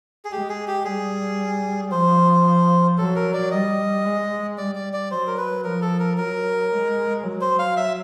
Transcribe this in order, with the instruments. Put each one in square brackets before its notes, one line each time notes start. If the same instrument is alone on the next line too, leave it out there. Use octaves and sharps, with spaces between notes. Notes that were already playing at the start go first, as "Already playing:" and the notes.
[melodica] G#4
[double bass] G#3 [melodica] G4
[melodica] G#4
G4
[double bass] G3 [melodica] G#4
[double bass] F3 [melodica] C5
[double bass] F#3 [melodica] A4
[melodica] A#4
D5
[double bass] G3 [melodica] D#5
[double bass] G#3
[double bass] G3 [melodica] D5
[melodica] D5
D5
[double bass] F#3 [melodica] C5
[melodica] A#4
B4
[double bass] F3 [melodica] A#4
[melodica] A4
A#4
[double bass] F#3 [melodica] A#4
[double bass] G#3
F#3
[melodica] C5
F5
E5